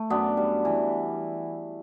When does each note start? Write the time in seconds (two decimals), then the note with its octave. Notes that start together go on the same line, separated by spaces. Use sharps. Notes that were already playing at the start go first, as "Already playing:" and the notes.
Already playing: A3
0.10 F#2 B3 D4
0.37 G3
0.65 E3